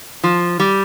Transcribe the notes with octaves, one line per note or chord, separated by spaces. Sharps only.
F3
G3